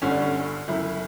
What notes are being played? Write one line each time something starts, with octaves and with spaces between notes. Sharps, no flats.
G1 G2 D3 C#4
D4
C#4
G1 F#2 C#3 E4